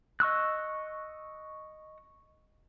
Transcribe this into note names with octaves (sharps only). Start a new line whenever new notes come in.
D#5 C#6 E6 F#6